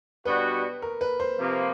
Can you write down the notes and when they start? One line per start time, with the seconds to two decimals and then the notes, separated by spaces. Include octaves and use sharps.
0.25 B2 G3 B3 D4 F#4 B4
0.82 A#4
1.01 B4
1.20 C5
1.38 C3 F3 A#3